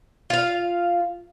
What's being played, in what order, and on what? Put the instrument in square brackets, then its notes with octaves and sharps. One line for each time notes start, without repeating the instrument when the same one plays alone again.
[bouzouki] F4 F5